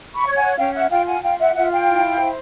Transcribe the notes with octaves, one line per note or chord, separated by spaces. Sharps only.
B5 C#6
C#5
F#5 G#5
C#4 F5 G5
E5 F#5
F4 F5 G5
F#5 G#5
F4 F5 G5
E5 F#5
F4 E5 F#5
F5 G5
E4
C5